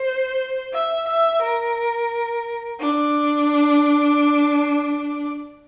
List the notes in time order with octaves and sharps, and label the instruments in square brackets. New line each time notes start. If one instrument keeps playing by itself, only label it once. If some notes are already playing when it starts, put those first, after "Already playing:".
Already playing: [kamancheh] C5
E5
E5
A#4
D4